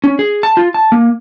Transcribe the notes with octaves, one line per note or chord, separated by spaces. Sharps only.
C#4
G#4
A5
F4
A5
A#3